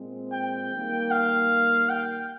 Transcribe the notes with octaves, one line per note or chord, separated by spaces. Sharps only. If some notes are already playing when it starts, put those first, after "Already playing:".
Already playing: A#2 G#3 C4
G5
D#3 G3 A#3
F5
G5